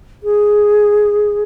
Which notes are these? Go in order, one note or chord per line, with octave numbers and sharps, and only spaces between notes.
G#4